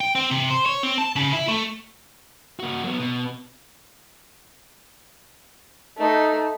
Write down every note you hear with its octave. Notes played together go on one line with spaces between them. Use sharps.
G5
C4
C3
C5
C#5
C4
A5
C#3
E4
A3
A#3 F#4
F#3 B3
B2
A3 D#4